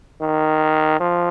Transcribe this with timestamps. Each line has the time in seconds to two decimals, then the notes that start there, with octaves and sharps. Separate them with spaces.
0.21 D#3
1.00 F3